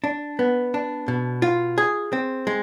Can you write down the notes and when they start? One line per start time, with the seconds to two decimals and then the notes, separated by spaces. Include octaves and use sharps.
0.04 D4
0.39 B3
0.74 D4
1.08 B2
1.42 F4
1.78 G#4
2.13 C4
2.47 G#3